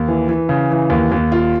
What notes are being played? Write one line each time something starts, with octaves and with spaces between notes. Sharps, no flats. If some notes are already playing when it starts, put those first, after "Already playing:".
Already playing: D#2
E3
E3
C#3
E3
D#2
D#2
F4